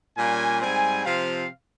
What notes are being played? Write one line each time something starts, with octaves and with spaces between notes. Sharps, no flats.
A#2 G3 A#3 C#4 G#5
G#2 G3 C4 G#5
C3 F3 C4 F5